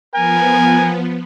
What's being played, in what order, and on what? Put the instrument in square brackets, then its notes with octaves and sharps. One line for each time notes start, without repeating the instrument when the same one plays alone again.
[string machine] F3 B3 [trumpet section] A#4 G#5